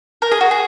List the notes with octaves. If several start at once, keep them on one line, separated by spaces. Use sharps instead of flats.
A#4
G#4
F#4
G#4